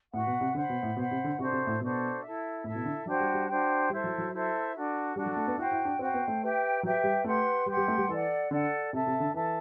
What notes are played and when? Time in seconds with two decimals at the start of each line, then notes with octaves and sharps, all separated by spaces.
0.13 A2 F#4 B4 F#5
0.27 B2
0.41 C3
0.55 D3 C5 F#5 B5
0.69 B2
0.83 A2
0.97 B2 C5 F#5 B5
1.11 C3
1.24 D3
1.38 C3 D4 F#4 A4 C5
1.52 C3
1.67 A2
1.80 B2 D4 F#4 A4 C5
2.22 E4 A4 E5
2.64 A2 E4 A4 E5
2.75 B2
2.85 D3
3.06 F#3 D4 F#4 C5 G5
3.20 G3
3.34 G3
3.48 D4 F#4 C5 G5
3.90 G3 E4 A4 C5 E5
4.04 F#3
4.18 F#3
4.32 E4 A4 C5 E5
4.74 D4 F#4 A4
5.16 G3 D4 F#4 A4
5.26 F#3
5.36 A3
5.47 B3
5.57 E4 F#4 C5 G5
5.72 E4
5.85 D4
5.99 C4 F#4 C5 G5
6.14 B3
6.28 A3
6.41 G4 B4 E5 G5
6.83 F#3 G4 B4 E5 G5
7.04 G3
7.24 A3 G4 B4 F#5 C6
7.66 G3 G4 B4 F#5 C6
7.77 G3
7.88 A3
7.98 G3
8.09 E3 A4 D5 F#5
8.50 D3 A4 D5 F#5
8.92 C3 A4 E5 A5
9.07 C3
9.20 D3
9.34 E3 A4 E5 A5